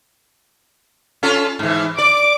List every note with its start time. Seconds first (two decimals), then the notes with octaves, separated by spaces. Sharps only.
1.23 C#4 F4 A4
1.59 G#2 E3
1.98 D5 D6